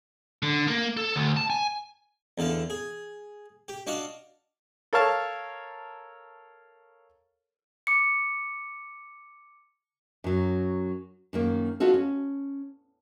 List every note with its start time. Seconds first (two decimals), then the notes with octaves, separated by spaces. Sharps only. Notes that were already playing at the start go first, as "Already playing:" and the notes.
0.42 D3
0.67 A#3
0.97 A4
1.16 D2
1.37 A5
1.50 G#5
2.38 E2 D3 A4 F5
2.70 G#4
3.68 G4
3.87 D4 F#4 D#5 F5
4.93 A4 A#4 C#5 F5 A5
7.87 D6 C#7
10.24 F#2 F#3
11.33 F#2 D#3 A#3
11.80 B3 D#4 F4 F#4 A4
11.94 C#4